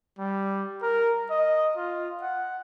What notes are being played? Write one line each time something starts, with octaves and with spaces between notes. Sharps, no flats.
G3
A#4
D#5
F4
F#5